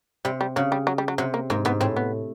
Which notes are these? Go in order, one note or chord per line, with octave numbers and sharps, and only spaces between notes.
C3 G3
G3
C#3 F#3
G3
F#3
G3
F#3
C3 F#3
A#3
G#2 A#3
G#2 B3
A2 C4
B3